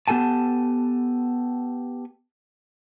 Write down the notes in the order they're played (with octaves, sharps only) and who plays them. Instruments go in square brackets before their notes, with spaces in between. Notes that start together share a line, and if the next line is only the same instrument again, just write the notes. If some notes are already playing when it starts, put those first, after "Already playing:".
[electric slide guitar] B3 G4 A4 G#5 A5